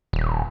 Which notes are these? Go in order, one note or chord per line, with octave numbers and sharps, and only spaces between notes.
D#1